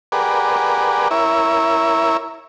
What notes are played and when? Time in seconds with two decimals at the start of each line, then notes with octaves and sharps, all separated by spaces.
0.12 G4 G#4 A#4 B4 D5 F#5
1.11 E4 A#4 C#5 E5